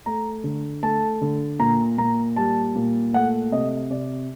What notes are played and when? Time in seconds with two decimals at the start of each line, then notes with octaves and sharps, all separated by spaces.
0.06 A3 A#5
0.44 D3
0.83 A3 A5
1.21 D3
1.59 A#2 A#5
1.98 A#2 A#5
2.36 G3 A5
2.75 A#2
3.13 A3 F#5
3.52 C3 D#5
3.90 C3 D5